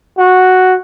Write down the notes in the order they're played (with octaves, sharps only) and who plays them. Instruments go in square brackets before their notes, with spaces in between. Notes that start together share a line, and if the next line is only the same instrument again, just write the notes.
[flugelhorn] F#4